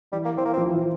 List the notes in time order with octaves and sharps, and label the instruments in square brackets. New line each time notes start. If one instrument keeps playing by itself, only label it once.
[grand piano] E3 [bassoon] G3
[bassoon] A#3
[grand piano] E3 [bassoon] C4
[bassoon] A#3
[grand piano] F3 [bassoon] C4
[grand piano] E3
F3